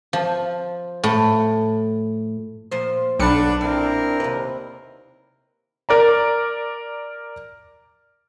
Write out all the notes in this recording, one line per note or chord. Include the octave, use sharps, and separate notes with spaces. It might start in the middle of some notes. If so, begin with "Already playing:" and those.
F3
A2
A#2 F3 C5
B1 D3 G3 D4 B4 D5 C#7
A#2 C4 D4 E4 A#4
D#2 C3 B4
A#4 D5 A#5